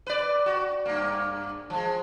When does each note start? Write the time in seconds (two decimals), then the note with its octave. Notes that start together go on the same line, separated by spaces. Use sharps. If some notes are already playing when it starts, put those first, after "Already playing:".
0.07 B4 D5
0.46 F#4
0.85 G2 A#3
1.70 F3 G#3